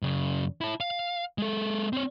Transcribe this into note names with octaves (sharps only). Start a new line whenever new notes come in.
F#2 C#3
E4 A5
F5
G#3 A4
C4 C#5